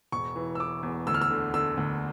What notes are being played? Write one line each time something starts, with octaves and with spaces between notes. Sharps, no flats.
E1 C#6
E3
E6
E3 D6
E2
D2 E6
F6
E6
D3
D3 E6
D2